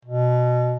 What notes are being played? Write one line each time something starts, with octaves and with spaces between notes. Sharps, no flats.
B2